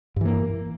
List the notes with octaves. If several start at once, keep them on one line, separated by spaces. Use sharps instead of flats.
G2 E3 A#3